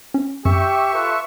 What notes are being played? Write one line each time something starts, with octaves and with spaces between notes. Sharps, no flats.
C#4
F#2 G4 E5 C#6
F4 A4 B4